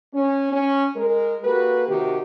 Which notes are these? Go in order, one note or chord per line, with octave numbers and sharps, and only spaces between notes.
C#4
C#4
G#3 A#4
A#3 F#4 G4 A4 B4
C3 D#3 C4 F#4 G4